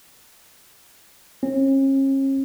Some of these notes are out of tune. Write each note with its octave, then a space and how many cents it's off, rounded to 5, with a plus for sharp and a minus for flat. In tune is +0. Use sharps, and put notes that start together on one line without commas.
C#4 -40